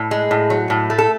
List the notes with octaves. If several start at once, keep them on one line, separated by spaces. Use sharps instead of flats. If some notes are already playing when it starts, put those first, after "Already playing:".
Already playing: A2
G#3
A2
F#3
A2
A3
A4